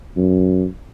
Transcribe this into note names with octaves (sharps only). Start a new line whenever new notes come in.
F#2